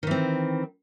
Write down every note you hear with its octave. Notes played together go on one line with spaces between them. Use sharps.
D#3 E3 C4